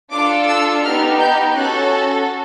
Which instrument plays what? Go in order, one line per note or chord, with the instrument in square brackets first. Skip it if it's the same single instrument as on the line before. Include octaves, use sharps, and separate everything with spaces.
[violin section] D4 F4 A4 D6
E6
B3 D#4 G4 F6
G6
C#4 F#4 A4 F#6